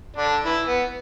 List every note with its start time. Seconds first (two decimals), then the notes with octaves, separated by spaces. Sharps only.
0.16 D3 D4
0.45 E3 E4
0.67 B3